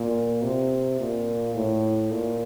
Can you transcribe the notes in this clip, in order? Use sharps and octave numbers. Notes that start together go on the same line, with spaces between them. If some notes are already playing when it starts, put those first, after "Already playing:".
Already playing: A#2
C3
A#2
A2
A#2